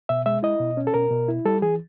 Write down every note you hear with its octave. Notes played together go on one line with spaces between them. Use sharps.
B2 E5
G#3 E5
E4 D#5
B2
C#4
A4
B2 A#4
B2
E4
G3 A4
E3 G#4